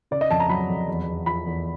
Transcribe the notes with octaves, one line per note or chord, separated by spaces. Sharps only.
C#3 D5
D#5
F2 A5
A#5
F#3 B5
F2
E2
E2
F3 B5
E2